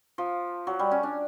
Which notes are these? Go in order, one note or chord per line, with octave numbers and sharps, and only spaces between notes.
F3
F#3
G3
C#4
D4